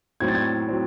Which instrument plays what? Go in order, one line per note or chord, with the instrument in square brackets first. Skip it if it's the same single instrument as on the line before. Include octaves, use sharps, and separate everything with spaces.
[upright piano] A2 F#3 C4 G#6
A6
G#6
F#3 C4